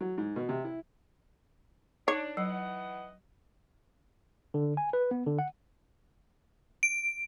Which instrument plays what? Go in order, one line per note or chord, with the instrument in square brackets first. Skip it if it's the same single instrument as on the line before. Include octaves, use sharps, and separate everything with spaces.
[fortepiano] F#3
G#2
B2
C3
E4
[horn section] D4 [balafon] D#4 [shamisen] C#5
[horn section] E3 D#5 F#5 [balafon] F#3
[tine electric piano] D3
G#5
B4
B3
D3
F#5
[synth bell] D7